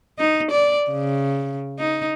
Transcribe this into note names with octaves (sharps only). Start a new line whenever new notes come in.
D#4
D5
C#3
D#4